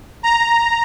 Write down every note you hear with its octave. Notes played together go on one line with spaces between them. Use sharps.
A#5